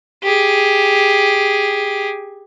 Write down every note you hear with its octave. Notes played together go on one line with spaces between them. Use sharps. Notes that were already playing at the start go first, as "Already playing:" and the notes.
G4 G#4